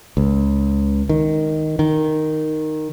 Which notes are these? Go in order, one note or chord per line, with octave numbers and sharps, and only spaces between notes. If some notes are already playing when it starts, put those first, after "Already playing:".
C#2
D#3
D#3